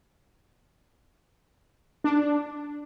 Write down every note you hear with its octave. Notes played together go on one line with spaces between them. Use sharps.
D4